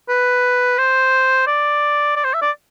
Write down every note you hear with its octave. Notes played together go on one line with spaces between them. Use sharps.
B4
C5
D5
D5
C5
E5
D5